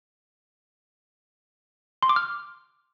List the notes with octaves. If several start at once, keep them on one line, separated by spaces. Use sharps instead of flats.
C6
D6
F6